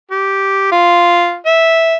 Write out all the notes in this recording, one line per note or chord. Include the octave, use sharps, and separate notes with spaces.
G4
F4
E5